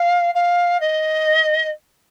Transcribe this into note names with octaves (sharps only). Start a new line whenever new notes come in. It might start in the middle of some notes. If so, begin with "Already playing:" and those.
Already playing: F5
F5
D#5